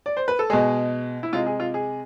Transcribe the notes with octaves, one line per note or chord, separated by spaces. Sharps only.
D5
C5
B4
A4
B2 G#3 G#4
E4
C3 G#3 F4
G#4
F4
G#4